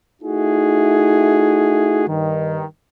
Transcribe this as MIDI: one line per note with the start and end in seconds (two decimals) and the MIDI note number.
0.22 2.07 57
0.22 2.07 63
0.22 2.07 64
0.22 2.07 66
0.22 2.07 68
2.07 2.63 43
2.07 2.63 51